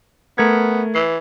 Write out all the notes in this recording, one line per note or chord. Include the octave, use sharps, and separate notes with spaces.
A3 B3 A#4 G#6
E3 C7